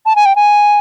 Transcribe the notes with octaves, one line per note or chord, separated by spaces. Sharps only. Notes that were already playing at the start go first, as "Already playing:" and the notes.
A5
G#5
G5
G#5